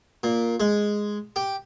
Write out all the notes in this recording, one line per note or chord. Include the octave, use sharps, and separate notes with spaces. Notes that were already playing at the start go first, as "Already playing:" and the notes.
A#2
G#3
G4